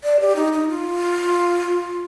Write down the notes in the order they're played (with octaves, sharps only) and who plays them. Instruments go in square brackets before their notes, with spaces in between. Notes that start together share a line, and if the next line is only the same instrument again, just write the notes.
[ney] D5
G4
D#4
D#4
F4